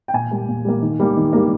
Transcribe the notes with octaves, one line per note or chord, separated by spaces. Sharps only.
G5
A#2 G#5
G3 A#3
A#2
G3 A#3
D#3
G3 A#3
D#3
G3 A#3